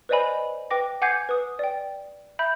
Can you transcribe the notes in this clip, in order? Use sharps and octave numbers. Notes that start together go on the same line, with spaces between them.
B4 C5 D5 D#5 G#5 B5
B4 G5 D6 A#6
F#5 G#5 D6 G6 G#6 C7
B4 D#6
D5 G5
E5 B5 G6